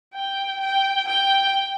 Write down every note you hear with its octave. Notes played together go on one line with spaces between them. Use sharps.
G5
G5
G5